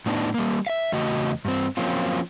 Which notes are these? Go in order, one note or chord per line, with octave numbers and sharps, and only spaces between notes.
A2 B3 D4 D#4
G3 A#3
E5 F5
E2 C#3 A3 F#4 D#5
G2 C4
F3 F#3 A#3 C4 C#4 F4